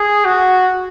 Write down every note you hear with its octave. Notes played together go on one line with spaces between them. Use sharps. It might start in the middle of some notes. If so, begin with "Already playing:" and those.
Already playing: G#4
F#4